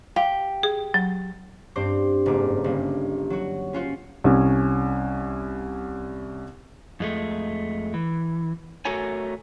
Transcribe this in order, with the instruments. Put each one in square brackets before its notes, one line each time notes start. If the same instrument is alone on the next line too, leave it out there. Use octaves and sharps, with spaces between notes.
[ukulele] G4 [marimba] F5
[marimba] G#4
F#3
[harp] G2 C4 C5 D6
F#1 G#2 A#3 D6
G1 A#3
F#3 F#4
C#4 F4 F#4 C5
[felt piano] C2 C#4
[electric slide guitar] F2 G#3 A3
E3
A3 F#4 A4 A#4 C#5 G#5